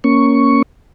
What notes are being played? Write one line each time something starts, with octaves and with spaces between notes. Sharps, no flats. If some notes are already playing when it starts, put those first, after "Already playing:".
A#3 C#4 C#6